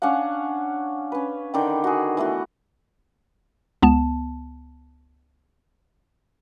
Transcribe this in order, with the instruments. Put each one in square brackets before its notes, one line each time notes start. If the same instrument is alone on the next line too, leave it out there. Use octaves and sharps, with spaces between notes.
[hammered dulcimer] C#4 D4 F5 F#5
C#4 B4
D3 D#3 D5 G5
F#4 G#4
E3 A3 B3 F#4
[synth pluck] C#2 B3 A5